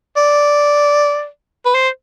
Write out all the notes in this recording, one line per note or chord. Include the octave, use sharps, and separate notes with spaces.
D5
B4
C5